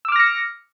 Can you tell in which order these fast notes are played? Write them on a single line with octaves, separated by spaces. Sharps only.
E6 D6 F6 A#6 C#7